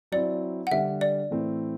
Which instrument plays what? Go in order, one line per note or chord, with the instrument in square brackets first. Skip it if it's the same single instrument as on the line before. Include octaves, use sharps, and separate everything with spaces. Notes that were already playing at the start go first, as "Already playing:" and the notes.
[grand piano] F#3 C4 E4 [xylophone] D5
[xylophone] F#5
[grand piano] D3 G3 D4 [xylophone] E5
[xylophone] D5
[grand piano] A2 E3 A3 C4 E4